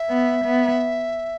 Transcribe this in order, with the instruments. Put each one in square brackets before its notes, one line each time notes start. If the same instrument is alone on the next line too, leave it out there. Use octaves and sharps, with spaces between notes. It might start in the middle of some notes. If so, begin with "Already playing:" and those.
Already playing: [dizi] E5
[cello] B3
B3